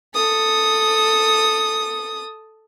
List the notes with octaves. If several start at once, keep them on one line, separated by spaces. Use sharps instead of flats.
A4 D#6